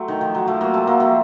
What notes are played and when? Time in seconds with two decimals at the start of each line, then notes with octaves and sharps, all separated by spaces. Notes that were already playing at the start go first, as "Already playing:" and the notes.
Already playing: F#3 A3 C4
0.08 D#3
0.21 F3
0.34 F#3
0.47 F3 A3
0.61 F#3 A#3
0.74 A3 C4
0.87 F#3 A#3
1.00 F3 A3